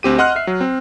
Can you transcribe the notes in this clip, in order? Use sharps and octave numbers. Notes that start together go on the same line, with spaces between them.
D2 C4 G4 D#7
D#5 F#5 C6 F6 F#6
E5 C7
F#3
C4